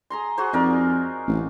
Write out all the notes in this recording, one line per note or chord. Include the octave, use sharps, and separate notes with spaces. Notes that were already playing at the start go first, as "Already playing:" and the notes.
G#4 A#5 C6
F#4 G#4 C5
F2 D#4 A#4 D5
A1